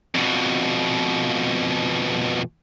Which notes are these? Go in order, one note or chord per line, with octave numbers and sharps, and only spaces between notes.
F2 B2